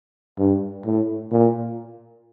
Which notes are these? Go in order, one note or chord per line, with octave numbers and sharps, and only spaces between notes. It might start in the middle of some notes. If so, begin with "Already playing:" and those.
G2
A2
A#2